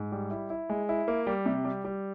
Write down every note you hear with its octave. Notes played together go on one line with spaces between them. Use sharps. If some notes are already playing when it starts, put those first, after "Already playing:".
Already playing: G#2
G3
E4
E4
G#3
E4
A#3
G3
C3
G3
G3